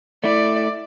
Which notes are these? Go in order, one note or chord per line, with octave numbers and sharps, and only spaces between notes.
A3 E4 D5